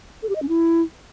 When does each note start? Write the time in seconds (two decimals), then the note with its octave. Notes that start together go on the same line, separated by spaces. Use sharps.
0.23 A4
0.29 G4
0.36 D#5
0.42 C#4
0.49 E4